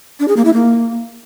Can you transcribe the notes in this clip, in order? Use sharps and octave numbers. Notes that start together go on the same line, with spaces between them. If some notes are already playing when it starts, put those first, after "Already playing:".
D4
G#4
A#3
E4
A#3